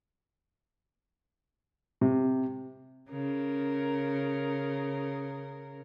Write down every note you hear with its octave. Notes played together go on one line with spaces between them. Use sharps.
C3
C#3 A#4